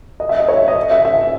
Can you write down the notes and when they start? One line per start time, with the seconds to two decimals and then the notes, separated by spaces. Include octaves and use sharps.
0.20 D#5
0.29 E5
0.39 D#5
0.48 C#5
0.57 E5
0.68 D#5
0.91 E5
1.05 E5